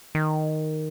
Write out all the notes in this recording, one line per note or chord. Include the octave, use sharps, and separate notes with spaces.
D#3